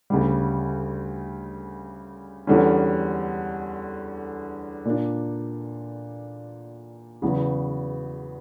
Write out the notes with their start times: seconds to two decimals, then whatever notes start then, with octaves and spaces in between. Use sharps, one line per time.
0.10 D2 C#3 G3
2.47 E2 D3 G3 C#4
4.85 A#2 A#3 D4
7.22 E2 C#3 F#3 B3